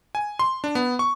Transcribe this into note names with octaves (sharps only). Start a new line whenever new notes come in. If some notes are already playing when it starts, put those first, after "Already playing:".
G#5
C6
D4
B3
C#6